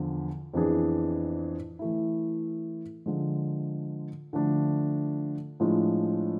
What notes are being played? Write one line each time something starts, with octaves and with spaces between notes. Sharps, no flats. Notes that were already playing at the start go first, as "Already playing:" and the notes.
Already playing: E2 D3 F3
F2 E3 B3 D4 G#4
E3 A3 E4
D3 F3 G#3
D3 F3 A3 D4
A2 F3 G#3 D4 F4